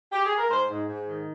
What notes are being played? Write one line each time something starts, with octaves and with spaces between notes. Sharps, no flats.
G4
G#4
A#4
G#2 C5
G#2
G#2
D#3